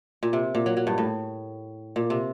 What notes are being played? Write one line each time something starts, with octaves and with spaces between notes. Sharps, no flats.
A#2
C3
A#2
F#3
F#3
G2
A2
A#2
C3